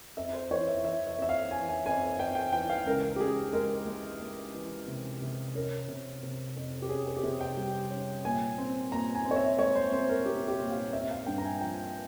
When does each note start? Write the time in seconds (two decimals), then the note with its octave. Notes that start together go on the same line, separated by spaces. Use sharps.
0.17 F2 E5
0.33 C5
0.51 E3 C#5
0.67 E5
0.84 E3 E5
1.07 E5
1.18 F2 E5
1.29 F5
1.51 E3 G#5
1.69 G#5
1.86 F2 G#5
2.19 F2 G5
2.35 G5
2.53 E3 G5
2.69 F5
2.86 C#2 A#4
3.16 G4
3.20 C#2 G#4
3.53 G#3 A#4
3.87 G#3
4.21 G#3
4.54 E3
4.87 C3
5.22 C3
5.55 C#4 A#4
5.88 C3
6.23 C3
6.56 F2
6.82 G4
6.89 C#4 G#4
7.06 G#4
7.17 G4
7.23 C3 G#4
7.41 G5
7.56 G3
7.90 C#4
8.25 A#2 G#5
8.58 C4
8.92 A#2 A#5
9.15 G#5
9.25 C4
9.31 C#5
9.36 E5
9.59 G#3 C#5
9.75 C5
9.92 C4 C5
10.09 A#4
10.26 C4 G4
10.48 G4
10.60 A#2
10.71 F5
10.93 C4 E5
11.11 F5
11.26 G2 G5
11.38 A#5
11.44 G#5
11.61 F3 G5